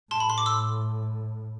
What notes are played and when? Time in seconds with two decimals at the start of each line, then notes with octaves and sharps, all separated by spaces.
0.11 A2 A5 C6
0.20 B5
0.30 C6
0.38 D6
0.46 C6 E6